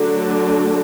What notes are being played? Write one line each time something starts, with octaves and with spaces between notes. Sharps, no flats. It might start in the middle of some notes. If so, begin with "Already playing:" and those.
Already playing: D3 F#3 A3 D4